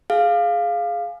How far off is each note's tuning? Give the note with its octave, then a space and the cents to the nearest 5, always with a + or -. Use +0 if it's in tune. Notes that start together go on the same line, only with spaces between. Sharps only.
G#4 +15 F5 +0